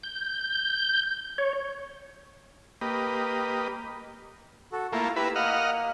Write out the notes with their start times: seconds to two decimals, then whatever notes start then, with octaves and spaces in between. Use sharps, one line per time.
0.03 G6
1.38 C#5
2.81 A#3 G4 B4 D#5
4.72 F#4 A4
4.93 A3 A#3 E4 F4 F5
5.16 E4 G4 B4 A#5 E6
5.36 A#3 D#5 F#5 F6